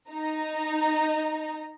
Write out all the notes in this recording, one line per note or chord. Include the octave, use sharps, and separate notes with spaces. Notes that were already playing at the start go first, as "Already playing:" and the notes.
D#4 A#5